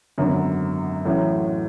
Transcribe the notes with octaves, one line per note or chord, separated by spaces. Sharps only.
G#1 F#2 D3 F#3 B3
A1 A2 F#3 A3 C#4